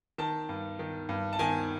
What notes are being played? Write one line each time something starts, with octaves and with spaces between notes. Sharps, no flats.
D#3 A5
G2
D#3
G2
A5
D#3 G#5